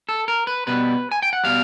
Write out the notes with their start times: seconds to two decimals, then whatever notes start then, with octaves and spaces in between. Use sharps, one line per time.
0.09 A4
0.28 A#4
0.47 B4
0.67 B2 G3 B4
1.12 G#5
1.22 G5
1.33 F#5
1.44 B2 G3 F5